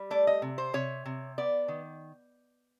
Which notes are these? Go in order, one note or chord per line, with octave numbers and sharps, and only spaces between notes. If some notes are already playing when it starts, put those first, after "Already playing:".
Already playing: G3
A3 D5
D#5
C3
C5
C3 C#5
C3
B3 D5
D#3